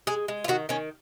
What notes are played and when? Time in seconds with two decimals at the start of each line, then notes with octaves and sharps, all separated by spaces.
0.07 G#3 G#4
0.28 G#3
0.44 F4
0.48 D#3 F#4
0.69 D#3 C#4